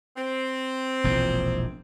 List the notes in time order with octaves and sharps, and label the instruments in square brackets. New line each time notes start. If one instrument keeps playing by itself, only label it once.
[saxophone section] C4
[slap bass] E1 A#1 E2